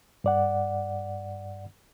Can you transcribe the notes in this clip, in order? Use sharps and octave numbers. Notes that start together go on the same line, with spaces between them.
G2 D5 F#5